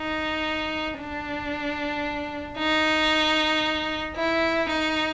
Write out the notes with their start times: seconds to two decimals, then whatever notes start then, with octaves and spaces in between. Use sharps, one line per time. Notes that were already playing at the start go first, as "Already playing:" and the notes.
Already playing: D#4
0.99 D4
2.58 D#4
4.16 E4
4.69 D#4